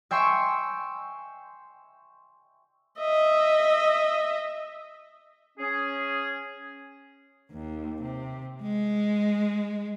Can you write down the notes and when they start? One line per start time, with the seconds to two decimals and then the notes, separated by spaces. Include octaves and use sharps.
0.11 E5 G5 G#5 C6 C#6
2.99 D#5 E5
5.58 C#4 G#4
7.52 D#2
8.02 C3
8.62 G#3